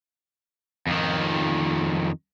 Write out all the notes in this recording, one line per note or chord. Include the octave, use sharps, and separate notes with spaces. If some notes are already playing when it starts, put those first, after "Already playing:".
F2 D#3